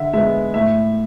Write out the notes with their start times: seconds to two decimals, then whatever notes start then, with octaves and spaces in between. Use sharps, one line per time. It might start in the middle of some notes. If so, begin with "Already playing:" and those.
Already playing: D3 E5 F#5
0.13 G#3 B3 E5
0.54 A2 E5